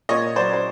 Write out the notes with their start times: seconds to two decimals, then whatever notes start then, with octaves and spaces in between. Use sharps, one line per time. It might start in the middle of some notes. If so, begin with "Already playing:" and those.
0.09 A#2 C#5 D#5
0.36 F#3 C5 D5
0.53 C5